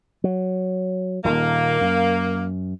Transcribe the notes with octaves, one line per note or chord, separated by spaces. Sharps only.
F#3
D#1 A#2 D#3 A#3
F#2